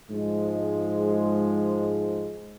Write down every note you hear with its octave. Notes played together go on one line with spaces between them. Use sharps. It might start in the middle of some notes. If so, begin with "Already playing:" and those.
G#2 F3 G#3